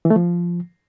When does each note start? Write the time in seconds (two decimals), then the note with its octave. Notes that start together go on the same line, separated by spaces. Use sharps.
0.05 E3
0.10 A3
0.16 F3